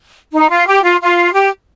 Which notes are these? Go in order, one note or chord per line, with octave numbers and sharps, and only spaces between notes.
D#4
F4
G4
F4
F4
G4